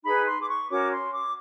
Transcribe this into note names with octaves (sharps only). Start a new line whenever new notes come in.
D#4 G#4 B4 B5
C6
D6
C#6
C#4 F#4 A#4 C#5 D6
C6
D6